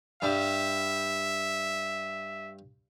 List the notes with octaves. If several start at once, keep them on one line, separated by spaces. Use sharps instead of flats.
G2 G3 E5 D6